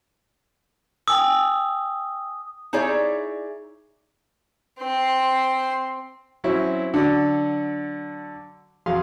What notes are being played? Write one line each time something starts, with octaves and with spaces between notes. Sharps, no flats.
G5 G#5 D#6 E6
D#4 E4 G#4 C#5 D5
C4 C6
F#3 C4 C#4 E4
D3 F#3 D5
E2 F#3 G#4 F5 C6